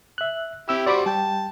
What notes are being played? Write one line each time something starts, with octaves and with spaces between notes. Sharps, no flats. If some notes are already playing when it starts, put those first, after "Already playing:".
E5 F#6
C4 E4 G4 E6
G3 F#4 C5 D5 B5 D6
G3 G5 A5